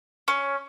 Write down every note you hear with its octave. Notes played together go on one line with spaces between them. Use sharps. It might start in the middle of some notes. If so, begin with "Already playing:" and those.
C#4